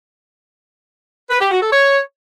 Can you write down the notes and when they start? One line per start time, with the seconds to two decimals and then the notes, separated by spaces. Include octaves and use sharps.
1.30 B4
1.41 G4
1.51 F#4
1.62 A4
1.73 C#5